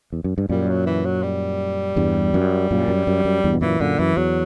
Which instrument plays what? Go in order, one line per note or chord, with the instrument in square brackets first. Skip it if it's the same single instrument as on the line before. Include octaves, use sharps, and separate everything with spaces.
[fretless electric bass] E2
F#2
G2
[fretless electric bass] F#2 A#2 [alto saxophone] G3
[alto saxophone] F#3
E3
F#3
G3
[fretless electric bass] E2 G2
F#2
F#2 A#2
F#2
F#2
F#2
E2 G2
B2
[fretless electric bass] F#2 A#2 [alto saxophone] E3
[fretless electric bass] F#2 A#2 [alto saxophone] D3
[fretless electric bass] F#2 [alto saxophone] E3
[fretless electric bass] E2 [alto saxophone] F#3